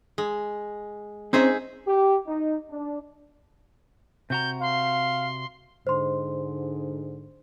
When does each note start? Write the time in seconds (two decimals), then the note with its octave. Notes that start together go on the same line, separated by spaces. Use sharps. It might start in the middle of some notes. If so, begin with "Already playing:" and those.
0.18 G#3
1.33 C4 C#4 D#4 G#4 C5 E5
1.86 G4
2.27 D#4
2.70 D4
4.30 C3 F#4 A#5 G6
4.61 F5 C6
5.87 G#2 D3 C5 C6